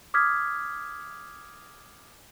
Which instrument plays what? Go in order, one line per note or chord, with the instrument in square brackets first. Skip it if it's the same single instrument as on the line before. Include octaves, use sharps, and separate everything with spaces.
[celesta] D6 D#6 F6 G#6 B6